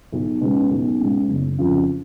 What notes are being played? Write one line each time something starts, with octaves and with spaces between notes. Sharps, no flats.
B1
B2 G#3 C#4
B1
B2 G#3 C#4
F#1
F2 C#3 F3